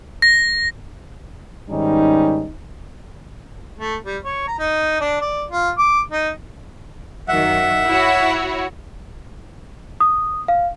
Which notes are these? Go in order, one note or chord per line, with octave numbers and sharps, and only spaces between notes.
A#6
G#2 D#3 G3 C#4 D#4
A3
G3
C#5
A#5
D#4
D4
D5
F4
D6
D#4
F#2 D#3 F#3 E5 F#5
E4 F#4 C#5
D#6
F5